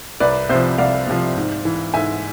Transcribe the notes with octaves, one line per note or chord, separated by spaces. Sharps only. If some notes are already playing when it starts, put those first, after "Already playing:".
C2 B4 D5
C3 F3 C5 E5
C2 D5 F5
C3 F3
G#2
E3
G#2 E5 G#5